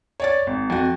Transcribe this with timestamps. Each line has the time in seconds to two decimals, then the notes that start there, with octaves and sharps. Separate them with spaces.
0.20 C#5 D5 A6
0.47 G#1
0.70 F2 F#4